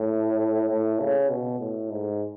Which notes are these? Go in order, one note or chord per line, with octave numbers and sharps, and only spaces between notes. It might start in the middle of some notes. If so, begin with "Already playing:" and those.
Already playing: A2
A2
C#3
B2
A2
G#2